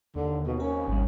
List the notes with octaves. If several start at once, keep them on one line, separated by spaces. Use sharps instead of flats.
D#2 D3
B2
C4 C#4 A#4
G#1 G3